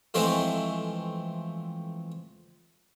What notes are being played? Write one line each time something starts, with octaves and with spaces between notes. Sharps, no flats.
F2 E3 G#3 A3 C4